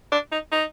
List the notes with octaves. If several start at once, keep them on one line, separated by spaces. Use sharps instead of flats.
D4
D#4
D#4